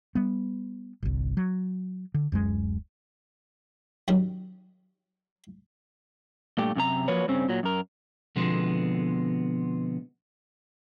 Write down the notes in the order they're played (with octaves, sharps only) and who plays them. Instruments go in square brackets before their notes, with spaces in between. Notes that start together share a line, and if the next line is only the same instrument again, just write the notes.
[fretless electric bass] G3 B3
G1 C2
F#3
D3
D1 F#2 G#3
[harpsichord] F#2 D#3 F#3 G3
[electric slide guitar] G2 A#2 A3 G4
F#2 C3 G4 A#5
F3 F#3 A#3 B4 C#5
G2 C#3 C4 C#4
A#2 F#3
F#2 A#4
[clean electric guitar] B2 D3 F3 G#3 B3 C4